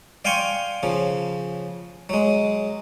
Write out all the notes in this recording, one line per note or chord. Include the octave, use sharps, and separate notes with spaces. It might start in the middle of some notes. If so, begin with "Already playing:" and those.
D5 F5 G5 G#5 C6 C#6
C#3 F3
F#3 G#3